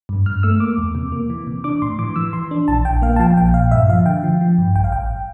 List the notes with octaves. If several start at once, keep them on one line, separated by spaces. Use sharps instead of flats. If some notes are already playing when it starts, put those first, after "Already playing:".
G2
G2 F6
A3 E6
A#3 D6
E2
C3
A#3
E3
C3
D4 D6
A2 C6
E3 D6
E3 E6
E3 C6
D4
A#1 A5
A#1 G5
A#3 F5
A5
F3 G5
A#1 G5
A#2 F5
G2 E5
F3 F5
D3 G5
F3
F3
G2
A1 G5
F5
A1 G5